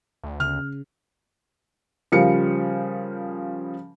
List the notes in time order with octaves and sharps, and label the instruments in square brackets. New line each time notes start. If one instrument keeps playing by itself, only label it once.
[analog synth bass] D2
[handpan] C#3 [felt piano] F6
[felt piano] C#3 F3 G3 A#4 F5 C#7